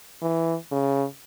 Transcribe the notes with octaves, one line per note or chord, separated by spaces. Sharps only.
E3
C#3